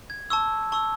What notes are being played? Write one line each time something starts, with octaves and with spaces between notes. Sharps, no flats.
G#6
A5 C#6 E6
A5 C#6 E6